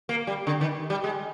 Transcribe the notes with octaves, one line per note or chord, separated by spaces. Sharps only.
A#3
G3
D3
D#3
G3
G#3